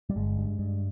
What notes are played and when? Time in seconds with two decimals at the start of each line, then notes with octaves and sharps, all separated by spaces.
0.10 G3
0.16 G1 G#3
0.38 G2
0.59 G2